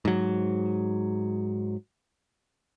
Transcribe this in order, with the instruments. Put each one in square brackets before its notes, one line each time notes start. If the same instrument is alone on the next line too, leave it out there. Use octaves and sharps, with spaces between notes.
[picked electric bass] G#2 F#3